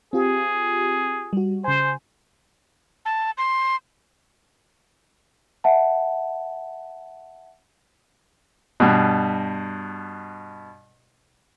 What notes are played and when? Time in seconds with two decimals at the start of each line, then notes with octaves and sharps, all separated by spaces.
0.13 C4 F4 G4 G#4
1.33 G3 F#4
1.64 C#3 C5 G#5
3.05 A5
3.38 C6
5.64 E5 F#5 A5
8.80 G2 B2